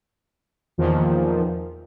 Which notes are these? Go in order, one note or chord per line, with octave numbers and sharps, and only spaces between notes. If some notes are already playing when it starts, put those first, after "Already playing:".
E2 A#2 D#3 F3